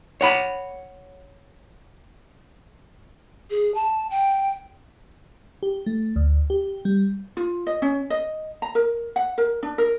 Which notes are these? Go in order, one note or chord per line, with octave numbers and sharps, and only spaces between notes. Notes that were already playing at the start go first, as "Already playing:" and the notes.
C#5 F#5 B5
G#4
A5
G5
G4
A3
D2
G4
G3
F4
D#5
C#4
D#5
A#5
A#4
F#5
A#4
D4
A#4